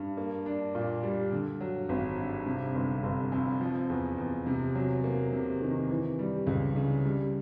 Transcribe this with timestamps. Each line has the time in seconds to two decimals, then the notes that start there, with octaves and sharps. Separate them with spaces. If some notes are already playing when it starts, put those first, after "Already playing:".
Already playing: G2
0.17 A#3
0.46 D4
0.75 A#2
1.03 G3
1.32 D3
1.61 F#3
1.89 G#1
2.18 G2
2.46 C3
2.75 G1
3.03 G1
3.32 F2
3.61 F3
3.90 E2
4.18 E2
4.46 C3
4.75 F#3
5.04 A#3
5.33 C3
5.61 D#3
5.90 E3
6.19 G3
6.47 C#2
6.76 C#3
7.05 G3